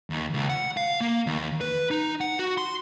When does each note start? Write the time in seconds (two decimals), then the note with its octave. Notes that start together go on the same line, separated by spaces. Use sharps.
0.10 D#2
0.34 C#2
0.50 F#5
0.77 F5
1.01 A#3
1.27 D#2
1.61 B4
1.91 D#4
2.21 F#5
2.39 F#4
2.58 C6